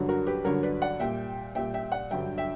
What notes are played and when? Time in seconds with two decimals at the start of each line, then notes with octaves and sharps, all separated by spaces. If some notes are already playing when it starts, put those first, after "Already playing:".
Already playing: G2 D3 F#3
0.09 F#4 A#4
0.27 G4 B4
0.44 G2 D3 F#3 A#4 C#5
0.63 B4 D5
0.82 D5 F#5
1.00 A#2 G3 E5 G5
1.55 A#2 G3 E5 G5
1.74 E5 G5
1.92 D5 F#5
2.11 G2 D3 F#3 E5 G5
2.38 E5 G5